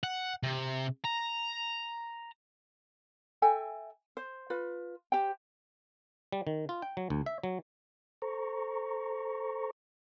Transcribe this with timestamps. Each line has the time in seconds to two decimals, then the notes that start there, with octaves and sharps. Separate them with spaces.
0.03 F#5
0.43 C3
1.05 A#5
3.42 A4 E5 G5 G#5
4.17 C5
4.50 F4 B4
5.12 G4 C5 G5
6.32 G3
6.47 D#3
6.69 F4
6.82 G5
6.97 F#3
7.10 D2
7.26 E5
7.43 F#3
8.22 A4 C5 A#5 C#6